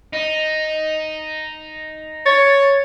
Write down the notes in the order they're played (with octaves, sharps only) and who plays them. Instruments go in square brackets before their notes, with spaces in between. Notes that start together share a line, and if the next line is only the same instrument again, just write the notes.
[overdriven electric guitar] D#4
[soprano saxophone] C#5 [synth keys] A6